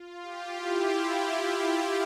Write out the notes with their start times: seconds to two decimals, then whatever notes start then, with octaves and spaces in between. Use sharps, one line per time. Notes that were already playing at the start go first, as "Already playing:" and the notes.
Already playing: F4
0.23 G4
0.56 E4